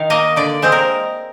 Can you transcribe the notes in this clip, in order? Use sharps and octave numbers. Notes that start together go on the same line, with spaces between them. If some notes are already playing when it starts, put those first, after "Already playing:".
Already playing: D#3 F5
A#3 D#5
D3 D5
G#3 C4 C5
A#4